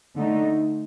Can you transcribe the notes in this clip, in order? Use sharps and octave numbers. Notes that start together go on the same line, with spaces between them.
D3 A3 D#4